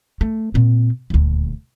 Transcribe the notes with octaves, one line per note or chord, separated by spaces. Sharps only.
A3
A#2 C4
D#1 D2